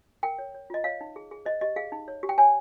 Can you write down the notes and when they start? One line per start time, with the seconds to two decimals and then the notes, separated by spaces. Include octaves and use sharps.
0.23 A#4 G5
0.39 C#5
0.55 C#5
0.70 F4 D#5
0.84 C#5 F5
1.01 D#4
1.16 G#4
1.31 G#4
1.45 C5 D#5
1.61 G4 D#5
1.76 G#4 F5
1.92 D#4
2.08 C#5
2.23 G4
2.29 G5
2.38 C#5 G#5